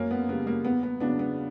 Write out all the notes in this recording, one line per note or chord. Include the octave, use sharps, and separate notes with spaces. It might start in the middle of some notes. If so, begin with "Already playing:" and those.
Already playing: F#2 A#3 C#4
B3
C#3 G3 B3
A#3
E2 B3
B3
C#3 F#3 B3 D4
B3